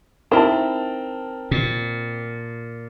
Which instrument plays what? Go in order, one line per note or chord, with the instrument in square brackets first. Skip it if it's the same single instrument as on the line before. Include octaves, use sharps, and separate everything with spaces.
[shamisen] D#3 E4 [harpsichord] C4 [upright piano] A#4 A5
[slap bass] A#2